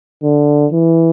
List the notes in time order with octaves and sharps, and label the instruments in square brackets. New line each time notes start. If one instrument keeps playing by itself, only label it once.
[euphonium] D3
E3